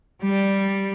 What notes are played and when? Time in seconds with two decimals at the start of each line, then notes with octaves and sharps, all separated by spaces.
0.19 G3